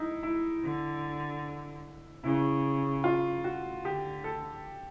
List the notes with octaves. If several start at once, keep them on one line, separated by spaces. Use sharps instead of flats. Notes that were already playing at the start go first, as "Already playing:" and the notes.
Already playing: D#4 E4
E4
D3
C#3 E4
F4
F#4
D3 G4
A4